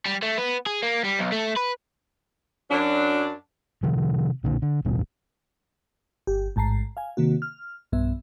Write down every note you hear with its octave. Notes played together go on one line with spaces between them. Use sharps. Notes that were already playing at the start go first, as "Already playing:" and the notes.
G3
A3
B3
G#4
A#3
G3
B1
A3
B4
F#2 F#3 D4
C3 D#3 F3
B1 A#2 D3
D3
D#1 A1 G2 B2
G1 G4
A1 G#2 A5 A#5 C7
F5 G#5
C3 D#3 A#3 F#4
F6
B1 G2 B3 E5